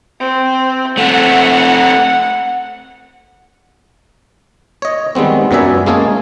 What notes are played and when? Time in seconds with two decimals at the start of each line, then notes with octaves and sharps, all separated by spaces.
0.20 C4
0.98 A3 C4 F#5
4.82 C#5 D#5
5.15 D#3 G3 G#3 B3 C4
5.51 F#2 F#3 B3 D5 E5 G#5
5.86 G#3 A#3 C#4 G#4 A5